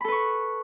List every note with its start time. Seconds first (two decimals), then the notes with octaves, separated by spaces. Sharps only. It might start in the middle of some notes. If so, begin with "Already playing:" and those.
0.01 B5
0.04 A4
0.08 B4
0.12 C#6